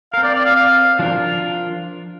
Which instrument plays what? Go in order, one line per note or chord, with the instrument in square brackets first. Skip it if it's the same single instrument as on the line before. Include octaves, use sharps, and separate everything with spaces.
[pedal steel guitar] C4 A#4 [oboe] F5
[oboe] D5
D5
F5
F5
[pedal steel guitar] F3 D4 F4 A#4